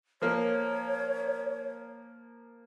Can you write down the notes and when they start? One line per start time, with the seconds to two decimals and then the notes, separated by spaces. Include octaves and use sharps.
0.22 F3 A#3 C#5